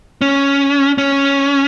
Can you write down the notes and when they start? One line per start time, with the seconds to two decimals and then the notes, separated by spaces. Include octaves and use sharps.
0.21 C#4
0.98 C#4